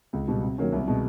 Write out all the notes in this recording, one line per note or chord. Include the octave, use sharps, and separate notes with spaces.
C#2
B2 G3
C3
D#3 F#3 A#3 C#4
C2
B2 G#3